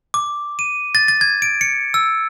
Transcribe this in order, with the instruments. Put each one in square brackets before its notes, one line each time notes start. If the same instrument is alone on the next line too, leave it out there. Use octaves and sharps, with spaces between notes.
[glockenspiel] D6
D#7
A6
A6
G#6
D7
C#7
E6